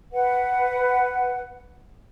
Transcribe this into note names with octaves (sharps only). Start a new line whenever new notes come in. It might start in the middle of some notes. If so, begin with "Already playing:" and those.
B4 F#5